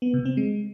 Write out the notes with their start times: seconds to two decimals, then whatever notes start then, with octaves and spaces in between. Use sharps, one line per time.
0.02 B3
0.14 C3
0.25 C4
0.37 G#3